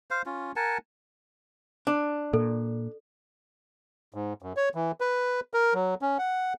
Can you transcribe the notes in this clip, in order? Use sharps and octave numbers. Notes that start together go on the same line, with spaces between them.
C5 F5
C#4 F4
A#4 F#5 G#5 A5
D4
A#2 A4
G#2
F#2
C#5
E3
B4
A#4
F#3
C#4
F#5